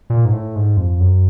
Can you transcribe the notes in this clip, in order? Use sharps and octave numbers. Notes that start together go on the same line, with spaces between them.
A#2
G#2
A2
G#2
F2
F#2